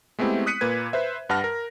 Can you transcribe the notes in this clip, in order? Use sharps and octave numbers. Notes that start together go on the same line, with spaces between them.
G#3 A3 B3 C4 E4 G4
D#6 F#6 B6 C#7 D#7
A#2 A#3 B4 G#6
B4 C5 E5
G2 B4 F#5 A5 F6 A#6
A#4